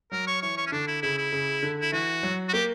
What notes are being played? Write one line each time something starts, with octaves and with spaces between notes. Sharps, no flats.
F#3 A#4
C#5
E3 C#5
C#5
C#4
D3 D4
E4
C#3 E4
E4
C#3
D3
E4
E3 F#4
F#3
F#4
A#3 G4